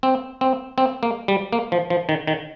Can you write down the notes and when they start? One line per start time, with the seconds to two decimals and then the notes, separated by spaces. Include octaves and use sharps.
0.03 C4
0.41 C4
0.78 C4
1.03 A#3
1.28 G3
1.53 A#3
1.72 F3
1.90 F3
2.09 D#3
2.27 D#3